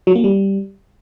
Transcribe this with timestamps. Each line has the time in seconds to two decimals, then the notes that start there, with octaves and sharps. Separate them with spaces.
0.07 F#3
0.15 A#3
0.24 G3